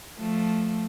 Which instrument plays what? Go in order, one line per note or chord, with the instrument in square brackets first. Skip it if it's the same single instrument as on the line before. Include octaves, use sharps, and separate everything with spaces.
[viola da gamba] F3 A3